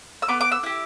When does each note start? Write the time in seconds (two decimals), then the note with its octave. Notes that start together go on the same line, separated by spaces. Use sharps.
0.22 E6
0.28 B3 D6
0.41 D6
0.52 E6
0.63 E4 G4